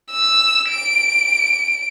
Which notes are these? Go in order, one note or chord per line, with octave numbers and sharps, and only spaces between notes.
E6
D7